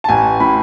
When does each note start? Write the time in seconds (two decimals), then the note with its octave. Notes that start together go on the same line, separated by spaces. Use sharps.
0.04 A5
0.09 A1 G#5
0.40 A2 B5